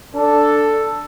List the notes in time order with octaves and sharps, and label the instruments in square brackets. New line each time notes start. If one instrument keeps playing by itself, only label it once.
[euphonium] D4 [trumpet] A4